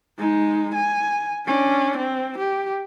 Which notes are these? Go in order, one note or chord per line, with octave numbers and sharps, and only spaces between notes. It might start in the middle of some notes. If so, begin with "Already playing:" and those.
G#3 D#4
G#5
C#4 D4
C4
G4